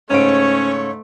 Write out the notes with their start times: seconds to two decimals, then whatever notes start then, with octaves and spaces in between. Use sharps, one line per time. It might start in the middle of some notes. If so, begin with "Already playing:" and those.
0.10 G#2 C#3 A3 C#4 C#5 D7